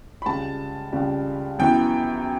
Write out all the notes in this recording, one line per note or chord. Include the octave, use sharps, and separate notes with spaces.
B5
C#2 C#3 G3 A5
C#2 C#3 G3
F#2 E3 B3 G5